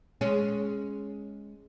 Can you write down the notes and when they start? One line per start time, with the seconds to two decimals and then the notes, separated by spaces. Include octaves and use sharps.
0.21 G#3 C#4